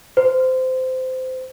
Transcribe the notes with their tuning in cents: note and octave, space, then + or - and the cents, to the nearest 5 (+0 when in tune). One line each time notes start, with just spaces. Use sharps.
C5 -20